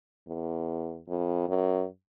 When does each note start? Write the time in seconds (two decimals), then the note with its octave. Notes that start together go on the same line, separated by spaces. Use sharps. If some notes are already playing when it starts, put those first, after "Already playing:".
0.27 E2
1.08 F2
1.49 F#2